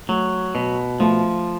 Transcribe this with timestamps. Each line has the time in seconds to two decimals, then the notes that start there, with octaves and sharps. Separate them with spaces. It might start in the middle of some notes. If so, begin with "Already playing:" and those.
0.09 F#3 A3
0.55 B2
1.00 F3 A3